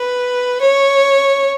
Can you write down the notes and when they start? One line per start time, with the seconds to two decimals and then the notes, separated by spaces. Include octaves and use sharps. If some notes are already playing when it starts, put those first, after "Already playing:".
Already playing: B4
0.61 C#5